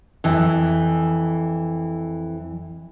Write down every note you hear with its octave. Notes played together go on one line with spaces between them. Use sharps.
F2 E3